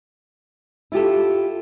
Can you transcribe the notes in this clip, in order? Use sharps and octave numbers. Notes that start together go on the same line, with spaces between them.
E4 F4 G4 A4